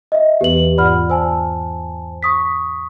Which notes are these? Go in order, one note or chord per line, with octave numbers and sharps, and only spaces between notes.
D#5 E5
E2 E3 B3 G4 B4 F#7
G#2 F4 D5 F#5 B5 F6
C5 G#5 A5 E6
C#6 D#6 B6